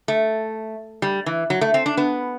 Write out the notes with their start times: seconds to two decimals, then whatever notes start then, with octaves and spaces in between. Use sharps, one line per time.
0.08 A3
1.02 G3
1.26 E3
1.50 F#3
1.61 A3
1.74 C4
1.86 D4
1.97 B3